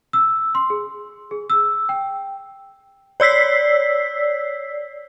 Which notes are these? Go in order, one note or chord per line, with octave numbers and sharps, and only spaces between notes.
E6
C6
G#4
G#4
E6
G5
C#5 D5 E6 B6 C7